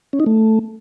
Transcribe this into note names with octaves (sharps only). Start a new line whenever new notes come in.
C#4
D#4
A3